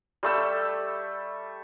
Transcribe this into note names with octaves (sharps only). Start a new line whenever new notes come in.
G3 A3 E6